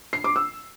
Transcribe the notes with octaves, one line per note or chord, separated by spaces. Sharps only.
C7
D6
E6